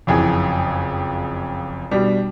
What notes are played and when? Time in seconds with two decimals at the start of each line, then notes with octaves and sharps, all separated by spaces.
0.07 F#1 F2 E3 G#4
1.91 B2 G3 D4